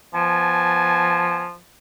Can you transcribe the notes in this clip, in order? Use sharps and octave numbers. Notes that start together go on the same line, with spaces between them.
F3 B3 G#5 A5